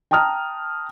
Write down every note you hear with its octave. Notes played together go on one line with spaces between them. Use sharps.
G5 A5 A#5 D#6 F6